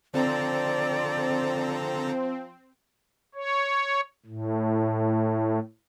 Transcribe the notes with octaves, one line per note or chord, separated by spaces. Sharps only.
D3 F3 C4 A4 D5 A#5
C#5
A2